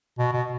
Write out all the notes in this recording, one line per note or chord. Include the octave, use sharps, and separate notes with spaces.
B2
B2